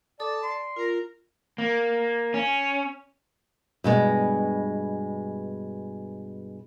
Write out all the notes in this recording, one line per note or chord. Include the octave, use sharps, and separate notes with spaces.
A4 D5 A5 D6 D#6
D5 C6
F4 A#4
A#3
C#4
G2 B2 G#3